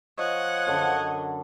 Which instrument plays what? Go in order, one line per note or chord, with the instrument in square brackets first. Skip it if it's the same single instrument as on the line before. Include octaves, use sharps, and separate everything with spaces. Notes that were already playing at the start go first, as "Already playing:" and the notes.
[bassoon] F3 [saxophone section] C#5 D#5 [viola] F#5
[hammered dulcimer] F#2 D3